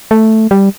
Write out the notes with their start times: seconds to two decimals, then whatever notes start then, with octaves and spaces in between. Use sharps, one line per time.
0.11 A3
0.51 G3